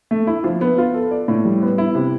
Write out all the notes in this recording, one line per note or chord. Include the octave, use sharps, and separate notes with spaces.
A3
E4
F3
B3
F4
A4
D5
A2
G3
B3
E4
C3